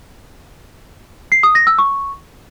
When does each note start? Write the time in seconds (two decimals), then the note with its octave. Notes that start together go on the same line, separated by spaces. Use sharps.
1.32 C7
1.43 D#6
1.55 A#6
1.67 E6
1.78 C#6